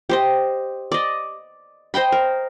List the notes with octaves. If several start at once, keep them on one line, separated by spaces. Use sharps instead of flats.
G4 C5 D#5
D5 D#5
C5 D#5 G5 B5
A#4